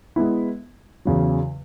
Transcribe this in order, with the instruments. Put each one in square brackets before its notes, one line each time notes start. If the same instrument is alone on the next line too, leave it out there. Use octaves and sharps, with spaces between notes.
[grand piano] G#3 B3 E4
E2 C#3 F#3